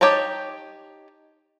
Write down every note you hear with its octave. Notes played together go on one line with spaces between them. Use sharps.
D#4 G4 C#5 A5 A#5